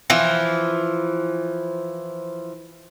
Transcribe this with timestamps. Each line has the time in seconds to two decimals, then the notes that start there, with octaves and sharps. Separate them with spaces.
0.10 E3 F3